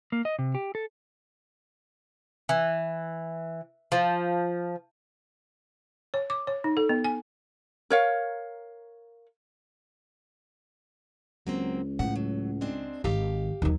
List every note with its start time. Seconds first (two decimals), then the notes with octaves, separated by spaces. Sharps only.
0.12 A#3
0.25 D#5
0.39 C3
0.55 G4
0.75 A4
2.49 E3
3.92 F3
6.14 C#5
6.30 D6
6.47 C#5
6.64 D#4
6.77 A4
6.89 B3
7.04 G#5
7.90 A#4 C#5 F5
11.47 C#2 F#3 A#3 C4
11.99 A2 F3 F#5
12.16 F#3
12.61 G#3 C4 D4
13.04 G#1 D#3 G4 F5
13.62 D#2 D#3 F#3